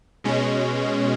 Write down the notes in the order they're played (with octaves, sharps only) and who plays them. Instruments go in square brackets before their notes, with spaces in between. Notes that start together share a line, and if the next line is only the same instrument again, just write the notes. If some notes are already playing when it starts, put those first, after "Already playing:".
[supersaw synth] B2 G#3 C#4